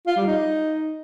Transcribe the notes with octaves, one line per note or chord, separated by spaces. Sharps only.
F4
G3
D#4